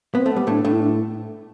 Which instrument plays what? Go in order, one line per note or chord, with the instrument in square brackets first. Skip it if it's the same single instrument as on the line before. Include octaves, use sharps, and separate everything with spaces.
[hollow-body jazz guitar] B3 [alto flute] C4
[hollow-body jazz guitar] A3
[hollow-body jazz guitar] G3 [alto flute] B3
[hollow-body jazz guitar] A2 A3 [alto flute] D4
[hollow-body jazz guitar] A2 A3 [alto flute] D4
[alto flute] E4
D4